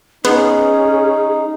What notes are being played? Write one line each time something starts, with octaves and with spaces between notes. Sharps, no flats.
B3 C#4 D#4 G#4